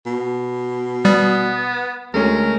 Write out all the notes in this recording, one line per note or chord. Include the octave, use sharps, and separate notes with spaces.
B2
G3 B3 D#6
D2 G#3 A3 C#4 A#4